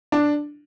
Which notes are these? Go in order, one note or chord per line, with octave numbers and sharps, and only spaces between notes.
D4